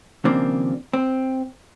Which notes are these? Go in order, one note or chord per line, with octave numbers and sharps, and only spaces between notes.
D#2 C#3 F3 A#3 C4 D4
C4